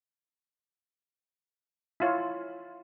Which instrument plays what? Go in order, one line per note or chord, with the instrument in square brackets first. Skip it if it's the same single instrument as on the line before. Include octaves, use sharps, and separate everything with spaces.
[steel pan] E4 F4 C#5